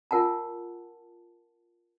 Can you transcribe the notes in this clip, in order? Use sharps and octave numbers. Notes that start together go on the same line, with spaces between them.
F4 A#4 F#5 G#5 A5